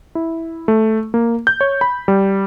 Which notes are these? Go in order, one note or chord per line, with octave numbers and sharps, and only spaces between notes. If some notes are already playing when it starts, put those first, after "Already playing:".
E4
A3
A#3
G6
C#5
B5
G3